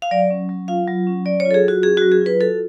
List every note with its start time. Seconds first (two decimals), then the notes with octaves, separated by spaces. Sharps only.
0.02 F5
0.11 F#3 D5
0.31 C#4
0.49 F#3
0.68 F4 F5
0.88 F#3
1.07 C#4
1.25 F#3 D5
1.40 C#5
1.45 F4
1.51 A4
1.54 G#4
1.64 F#3 F#4
1.82 C#4 G#4
1.97 F#4
2.02 F#3
2.12 G#4
2.21 F4
2.26 B4
2.40 F#4 A4